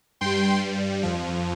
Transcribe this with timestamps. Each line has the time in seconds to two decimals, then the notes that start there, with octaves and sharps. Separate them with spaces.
0.21 G2 G3 G5 C6
1.03 F2 F3